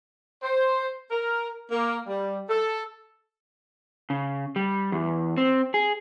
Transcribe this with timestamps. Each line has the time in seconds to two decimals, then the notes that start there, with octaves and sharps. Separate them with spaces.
0.43 C5
1.11 A#4
1.71 A#3
2.07 G3
2.49 A4
4.10 C#3
4.56 G3
4.92 E2
5.37 C4
5.74 G#4